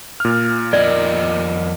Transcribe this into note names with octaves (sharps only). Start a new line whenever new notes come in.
A#2 F6
F2 A#4 D5 D#5